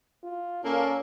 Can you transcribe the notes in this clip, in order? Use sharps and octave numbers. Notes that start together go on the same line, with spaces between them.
F4
A#2 A#3 C#4 A4